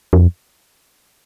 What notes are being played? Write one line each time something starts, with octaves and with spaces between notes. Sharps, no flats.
F2